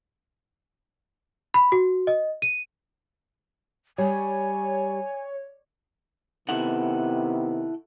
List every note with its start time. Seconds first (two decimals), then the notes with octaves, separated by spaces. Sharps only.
1.54 B5
1.72 F#4
2.07 D#5
2.42 D#7
3.98 G3 C#5 G#5
6.49 C3 D#3 B3 E4 A4 F#5